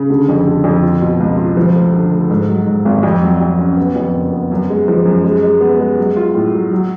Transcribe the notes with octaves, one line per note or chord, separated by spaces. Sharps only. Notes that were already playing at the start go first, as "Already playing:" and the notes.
Already playing: C#3
D3
F2
D3
F2
F4
B2
C#2
F4
F3
A3
D3
A3
G#2
F#3
G#2
G#1
F2
F#3
F2
C#4
B3
F2
F#1
B3
F#2
G#3
F3
F#2
G#3
G#3
B3
G#3
F#3
F4
A2
F#3
F#3